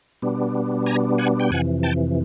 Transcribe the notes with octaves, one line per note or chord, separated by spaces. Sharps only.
B2 G3 B3 D4
G#5 A#5
F#5 G#5
G5
F2 C3 E3 F#5 G#5
G5 A5